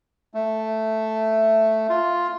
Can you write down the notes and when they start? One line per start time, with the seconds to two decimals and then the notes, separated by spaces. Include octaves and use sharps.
0.34 A3
1.89 F4